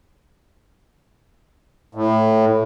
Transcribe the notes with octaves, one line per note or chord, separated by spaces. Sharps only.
A2